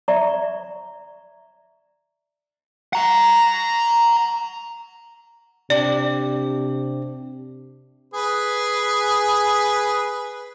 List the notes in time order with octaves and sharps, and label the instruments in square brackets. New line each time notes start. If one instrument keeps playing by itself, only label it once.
[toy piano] D5 E5 A#5 C#6
[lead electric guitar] F#5 A#5
[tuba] C3 [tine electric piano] D4 G4 [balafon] D5
[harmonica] G#4 B4